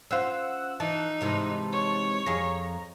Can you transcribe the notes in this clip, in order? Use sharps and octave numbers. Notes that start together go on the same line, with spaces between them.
C#4 F4 C5 F#5 E6
E3 D#4 A5
G#2 C3 E3
C#5
F2 G#4 A#5